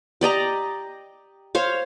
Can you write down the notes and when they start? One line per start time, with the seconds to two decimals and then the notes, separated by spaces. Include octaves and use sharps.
0.21 G4 D5 D#5 A#5
1.55 C5 C#5 F5